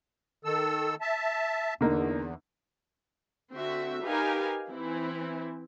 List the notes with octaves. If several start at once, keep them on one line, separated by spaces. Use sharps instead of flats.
D#3 A4 E6
E5 A5
E2 D3 A#3 D#4
D3 C4 F#4 E5
D#4 G4 A#4 B4 F5 G#5
E3 C4 E4